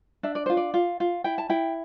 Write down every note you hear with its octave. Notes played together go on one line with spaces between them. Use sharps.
D4 E5
D5
F4 C5
D5
F4
F4
E4 G5
A5
E4 G5